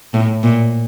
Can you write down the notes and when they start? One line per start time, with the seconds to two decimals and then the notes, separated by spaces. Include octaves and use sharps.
0.14 A2
0.43 A#2